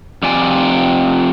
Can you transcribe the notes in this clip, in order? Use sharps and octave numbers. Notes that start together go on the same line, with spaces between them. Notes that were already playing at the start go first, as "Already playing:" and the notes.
F2 C3 D5 G#5